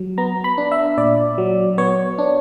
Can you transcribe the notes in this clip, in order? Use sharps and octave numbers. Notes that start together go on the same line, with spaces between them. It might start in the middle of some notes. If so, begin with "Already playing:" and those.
Already playing: F#3
B3 A#5
B5
D4
E5
A#2 D5
F#3
B3 C#5
D4